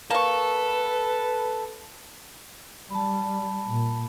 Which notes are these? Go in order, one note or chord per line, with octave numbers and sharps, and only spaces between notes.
A#3 A4 B4 C#6
G3 A5 B5
A#2